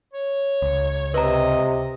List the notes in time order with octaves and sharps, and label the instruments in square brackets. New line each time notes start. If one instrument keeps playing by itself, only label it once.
[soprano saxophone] C#5
[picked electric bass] C#2
[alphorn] C3 [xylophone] B4 A#5 [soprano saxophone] D#5